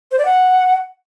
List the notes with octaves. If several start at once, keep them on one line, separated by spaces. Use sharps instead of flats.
C5
D5
F#5